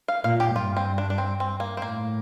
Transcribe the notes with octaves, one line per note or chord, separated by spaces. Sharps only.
F5
A#2 F5
G4
G2 F4
C4
D4
D4
C4
C4
A#3
C4
A2 A#3